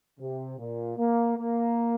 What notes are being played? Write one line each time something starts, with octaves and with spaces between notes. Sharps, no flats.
C3
A#2
A#3
A#3